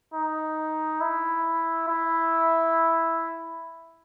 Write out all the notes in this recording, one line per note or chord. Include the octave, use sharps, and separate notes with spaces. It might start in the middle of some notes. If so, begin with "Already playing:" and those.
D#4
E4
E4